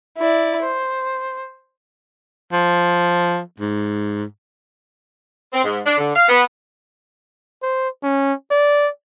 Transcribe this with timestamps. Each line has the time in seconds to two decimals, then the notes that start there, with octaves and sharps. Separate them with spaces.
0.18 E4 D5
0.62 C5
2.52 F3
3.60 G#2
5.53 C4
5.65 G#2
5.86 D4
5.98 D3
6.16 F5
6.29 B3
7.62 C5
8.03 C#4
8.51 D5